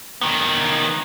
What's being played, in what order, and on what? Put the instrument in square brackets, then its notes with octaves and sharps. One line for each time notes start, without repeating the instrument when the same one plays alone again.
[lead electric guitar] D#3 B3